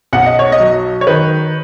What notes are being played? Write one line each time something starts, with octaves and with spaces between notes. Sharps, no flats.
B1 F#5
D#5
C#5
D#5
F#3
C#5
D#3 B4